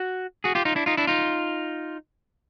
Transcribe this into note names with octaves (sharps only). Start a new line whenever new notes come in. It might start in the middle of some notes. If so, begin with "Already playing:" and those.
Already playing: F#4
F#4 G#4
F4 G4
D#4 F4
D4 E4
D#4 F4
D4 E4
D#4 F4